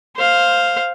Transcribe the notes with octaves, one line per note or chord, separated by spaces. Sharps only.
C5 F5